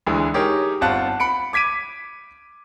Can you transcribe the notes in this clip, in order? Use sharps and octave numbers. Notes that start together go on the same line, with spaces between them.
D2 D3 E3 G#3
D#4 G4 G#4 A#4 C#5
G1 C4 F4 F#5 A5 F#6
B5 C#7 D7
D6 G#6 B6 D7 D#7